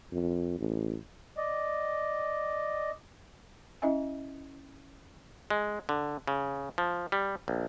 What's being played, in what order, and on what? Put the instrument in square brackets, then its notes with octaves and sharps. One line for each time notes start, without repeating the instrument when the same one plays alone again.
[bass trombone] F2
A1
[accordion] D5 D#5
[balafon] C#4 E4 D#5 E5 G#5
[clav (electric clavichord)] G#3
D3
C#3
F3
G3
A#1